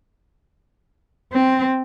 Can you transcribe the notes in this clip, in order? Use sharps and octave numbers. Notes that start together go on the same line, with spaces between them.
C4